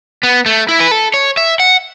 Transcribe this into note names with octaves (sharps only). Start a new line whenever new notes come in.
B3
A3
E4
B4
A4
C#5
E5
F#5